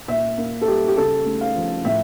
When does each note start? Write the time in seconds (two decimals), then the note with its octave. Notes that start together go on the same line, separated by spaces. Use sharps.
0.08 A#2 E5
0.38 A#3
0.62 A4
0.67 G3 G4
0.88 G4
0.97 C#3 A4
1.26 A3
1.41 F5
1.55 F3
1.85 A2 E5